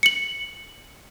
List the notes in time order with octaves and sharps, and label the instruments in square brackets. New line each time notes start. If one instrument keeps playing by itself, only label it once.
[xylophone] C#7 F#7